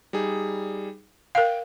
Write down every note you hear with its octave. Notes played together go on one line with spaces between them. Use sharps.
G3 D#4 G#4
A#4 F5 G5